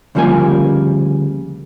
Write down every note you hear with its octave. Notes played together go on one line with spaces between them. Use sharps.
D2 C#3 F3 G3 A#3 G#5